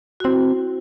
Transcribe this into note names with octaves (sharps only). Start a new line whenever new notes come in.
F#4
C4 E4